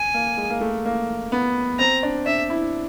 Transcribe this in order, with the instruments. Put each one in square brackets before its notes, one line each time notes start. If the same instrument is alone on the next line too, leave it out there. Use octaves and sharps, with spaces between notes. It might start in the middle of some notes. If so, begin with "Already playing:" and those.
Already playing: [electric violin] G#5
[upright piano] A#3
G#3
A#3
A3
A#3
B3
[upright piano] C4 [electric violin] A#5
[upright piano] D4
[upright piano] D4 [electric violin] E5
[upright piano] E4